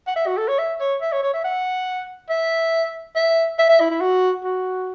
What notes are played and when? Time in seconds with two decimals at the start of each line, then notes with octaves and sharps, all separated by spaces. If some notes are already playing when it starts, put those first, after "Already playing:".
0.07 F#5
0.16 E5
0.27 F#4
0.37 A4
0.48 C#5
0.58 E5
0.80 C#5
1.01 E5
1.12 C#5
1.23 C#5
1.34 E5
1.44 F#5
2.30 E5
3.16 E5
3.58 E5
3.69 E5
3.80 E4
3.91 E4
4.01 F#4
4.44 F#4